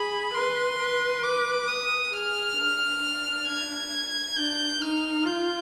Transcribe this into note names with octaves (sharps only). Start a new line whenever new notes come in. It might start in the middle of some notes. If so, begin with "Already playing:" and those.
Already playing: G#4 B5
B4 C6
B4
D6
D#6
G#4 F6
D4
D4
G#6
D4 G6
D#4 F6
F4 G6